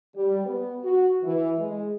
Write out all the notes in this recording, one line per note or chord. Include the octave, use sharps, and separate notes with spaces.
G3
B3
F#4
E3
G#3